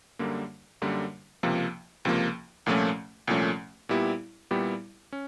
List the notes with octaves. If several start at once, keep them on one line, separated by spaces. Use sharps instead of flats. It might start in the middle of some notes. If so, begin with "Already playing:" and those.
F#2 D3 G3 A#3
F#2 D3 G3 A#3
C#2 C3 F3 A#3
C#2 C3 F3 A#3
C2 A#2 F3 A3 C#4
C2 A#2 F3 A3 C#4
A#2 G3 B3 E4 G4
A#2 G3 B3 E4 G4
C#4